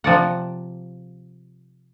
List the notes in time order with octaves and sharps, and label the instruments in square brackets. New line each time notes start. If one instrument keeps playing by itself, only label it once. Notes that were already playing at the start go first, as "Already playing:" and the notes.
[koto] C3 F3 D5 F#5